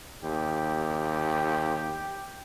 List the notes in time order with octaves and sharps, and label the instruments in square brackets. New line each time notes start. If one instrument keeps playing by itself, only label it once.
[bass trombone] D#2 [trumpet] G4